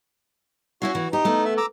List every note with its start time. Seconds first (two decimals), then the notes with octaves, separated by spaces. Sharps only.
0.82 C#4 E4 F#4 F5
0.95 E3
1.13 D#4 G4
1.25 A3 B3
1.45 E5
1.58 A#5 D6 E6